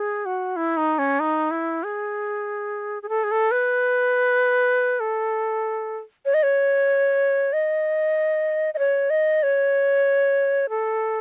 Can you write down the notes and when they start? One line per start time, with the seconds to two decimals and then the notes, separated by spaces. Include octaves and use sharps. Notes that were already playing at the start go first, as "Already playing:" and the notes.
Already playing: G#4
0.26 F#4
0.56 E4
0.77 D#4
0.99 C#4
1.20 D#4
1.51 E4
1.83 G#4
3.03 G#4
3.09 A4
3.24 G#4
3.31 A4
3.51 B4
5.00 A4
6.25 C#5
6.34 D#5
6.43 C#5
7.53 D#5
8.74 D#5
8.79 C#5
9.10 D#5
9.43 C#5
10.69 A4